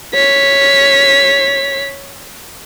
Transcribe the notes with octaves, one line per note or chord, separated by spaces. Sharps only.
C#5 B6